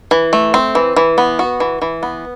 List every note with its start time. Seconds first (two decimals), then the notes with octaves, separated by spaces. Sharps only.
0.11 E3
0.33 A3
0.54 C4
0.75 E3
0.96 E3
1.18 B3
1.39 F#4
1.60 E3
1.82 E3
2.03 B3